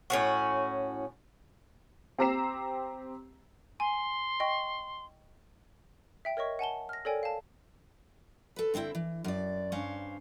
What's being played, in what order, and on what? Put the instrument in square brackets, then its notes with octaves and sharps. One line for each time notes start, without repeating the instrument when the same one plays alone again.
[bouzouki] A2 C#4 F#4
[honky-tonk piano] C4 G4 A#5 E6 C7 E7
[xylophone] G#5 [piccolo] C6
[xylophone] D#5 G5 C#6
E5 G5 B6
A#4 C#5 D#5 C#6
F#5 G#5 A5 G7
F6 A#6
A4 A#4 C#5 D5 G5 G#5
F5 A5
[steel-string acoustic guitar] A4 B4
D3 C4 C#4 E4 G5
E3
F#2 D5
G2 C#4 C5 F5